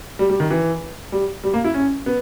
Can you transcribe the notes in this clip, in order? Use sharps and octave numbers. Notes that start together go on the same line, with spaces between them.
G3
G3
D#3
E3
G3
G3
A#3
E4
C#4
B3